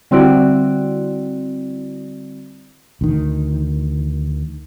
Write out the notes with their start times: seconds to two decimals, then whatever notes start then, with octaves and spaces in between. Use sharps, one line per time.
0.11 D3 G3 C4 E4 F#4 D5
3.01 D2 D#3